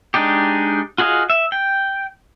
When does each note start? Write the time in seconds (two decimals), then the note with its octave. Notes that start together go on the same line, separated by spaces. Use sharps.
0.14 G#3 D4 D#4 G4
0.98 F4 F#4 G#4 D#5 F5
1.30 E5
1.52 G5